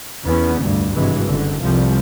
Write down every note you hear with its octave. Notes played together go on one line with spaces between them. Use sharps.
E2 B3 C#4
F1 D2 G2
G#1 G2 C3 E3 F#3 G#3
F#1 D3
C2 F3 G3